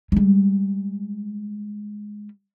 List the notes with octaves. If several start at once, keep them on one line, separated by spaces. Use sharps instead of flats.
G3 G#3